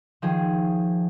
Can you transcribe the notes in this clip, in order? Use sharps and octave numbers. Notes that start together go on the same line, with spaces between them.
D#3 F3 G#4